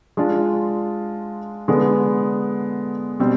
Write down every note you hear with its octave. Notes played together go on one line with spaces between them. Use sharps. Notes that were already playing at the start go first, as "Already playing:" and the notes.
G#3 D4 F4
D3 G#3 B3
B2 G3 C4